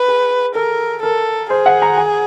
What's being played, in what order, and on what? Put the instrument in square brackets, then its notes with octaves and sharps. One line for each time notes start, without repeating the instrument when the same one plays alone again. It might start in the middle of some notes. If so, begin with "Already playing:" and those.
Already playing: [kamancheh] B4
[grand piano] G#4
[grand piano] A4 [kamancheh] A#4
[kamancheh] A4 [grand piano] A#4
[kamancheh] G#4 [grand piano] C5
[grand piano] F#5
A#5
G#5